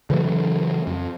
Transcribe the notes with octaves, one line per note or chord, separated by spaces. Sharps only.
C#3 E3 F#3 A3
F2